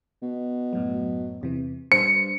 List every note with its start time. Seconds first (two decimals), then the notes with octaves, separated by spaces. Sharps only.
0.22 B2
0.73 F#2 A2 F#3
1.41 E2 C3 E3
1.92 G2 C5 C#7